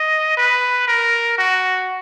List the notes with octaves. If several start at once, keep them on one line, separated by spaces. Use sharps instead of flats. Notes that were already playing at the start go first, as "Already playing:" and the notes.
Already playing: D#5
B4
A#4
F#4